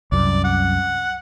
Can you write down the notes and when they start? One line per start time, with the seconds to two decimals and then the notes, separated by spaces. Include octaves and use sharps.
0.12 C2 F#2 D5
0.44 F#5